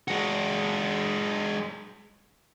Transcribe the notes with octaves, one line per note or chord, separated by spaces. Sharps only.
G#3 F#4